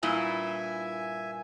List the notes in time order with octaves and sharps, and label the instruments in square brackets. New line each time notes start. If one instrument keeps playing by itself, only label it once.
[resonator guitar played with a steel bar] G2 A#2 E4 [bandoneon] E5 G#5